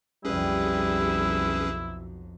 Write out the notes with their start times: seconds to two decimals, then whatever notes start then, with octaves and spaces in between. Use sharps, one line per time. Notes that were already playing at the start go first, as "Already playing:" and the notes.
0.25 B1 F2 G3 C#4 E4 G#4 B4